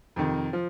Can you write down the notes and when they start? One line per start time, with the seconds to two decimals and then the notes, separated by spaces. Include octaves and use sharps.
0.16 F2 C3 D#3
0.53 F3